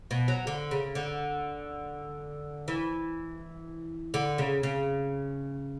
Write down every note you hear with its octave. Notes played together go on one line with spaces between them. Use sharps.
B2
F#3
D3
C#3
D3
E3
D3
C#3
C#3